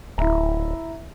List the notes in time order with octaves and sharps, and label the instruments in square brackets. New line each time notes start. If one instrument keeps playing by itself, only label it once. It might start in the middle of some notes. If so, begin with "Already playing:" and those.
[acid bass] D1 [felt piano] E4 E5 A#5